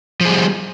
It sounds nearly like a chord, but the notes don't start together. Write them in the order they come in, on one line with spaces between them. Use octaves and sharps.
F3 G#4 G3